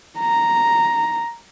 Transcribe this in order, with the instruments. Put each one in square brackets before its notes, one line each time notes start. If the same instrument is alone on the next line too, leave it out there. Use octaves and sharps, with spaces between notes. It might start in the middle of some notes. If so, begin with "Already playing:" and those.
[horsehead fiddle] A#5